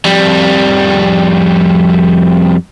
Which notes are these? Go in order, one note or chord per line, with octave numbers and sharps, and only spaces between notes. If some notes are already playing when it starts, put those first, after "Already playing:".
F2 G3